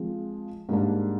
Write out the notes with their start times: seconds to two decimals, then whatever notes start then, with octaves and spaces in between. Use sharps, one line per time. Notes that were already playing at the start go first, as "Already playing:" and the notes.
Already playing: F3 G#3 C4
0.69 G#2 G3 A#3 D4